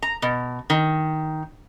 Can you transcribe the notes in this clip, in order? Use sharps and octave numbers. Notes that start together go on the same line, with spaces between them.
A#5
B2
D#3